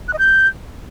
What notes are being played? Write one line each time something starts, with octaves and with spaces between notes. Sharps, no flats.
F#6
D#5
G6